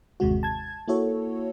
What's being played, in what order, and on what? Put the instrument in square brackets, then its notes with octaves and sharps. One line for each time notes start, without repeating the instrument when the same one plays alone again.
[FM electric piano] G1 D#2 C3 G#3 F#4
A5 G#6
A#3 E4 F#4 A4 C#5